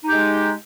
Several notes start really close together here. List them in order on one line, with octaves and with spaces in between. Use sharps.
D#4 G4 G#3